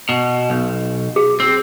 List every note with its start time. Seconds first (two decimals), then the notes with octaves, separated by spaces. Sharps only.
0.09 B2
0.50 B1
1.16 G#4
1.40 C4